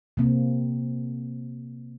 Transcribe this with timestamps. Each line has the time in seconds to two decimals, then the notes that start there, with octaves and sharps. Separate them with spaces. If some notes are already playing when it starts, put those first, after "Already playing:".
0.17 C3 A#3 C4